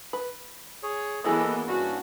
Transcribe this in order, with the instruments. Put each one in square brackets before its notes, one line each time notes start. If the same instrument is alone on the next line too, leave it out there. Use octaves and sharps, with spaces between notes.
[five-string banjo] B4
[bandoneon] G#4 C#5
[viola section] E3 A#3 B3 [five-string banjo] F#3 E4 G#4 [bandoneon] A4 D#5
[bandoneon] G2 C#4 D4 [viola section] F#4